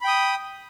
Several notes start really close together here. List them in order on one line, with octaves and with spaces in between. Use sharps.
B5 G5 D#6